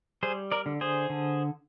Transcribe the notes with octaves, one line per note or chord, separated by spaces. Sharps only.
G3 G#4 C5
A#4 D5
D3
G#4 C5
D3